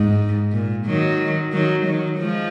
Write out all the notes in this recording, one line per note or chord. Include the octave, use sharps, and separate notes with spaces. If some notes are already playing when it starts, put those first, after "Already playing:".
Already playing: G#2
A#2
D#3 F#3
D#3 F#3
D#3 F#3
F3 G#3